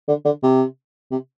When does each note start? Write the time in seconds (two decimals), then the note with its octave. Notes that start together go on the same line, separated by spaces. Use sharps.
0.08 D3
0.25 D3
0.43 C3
1.12 C3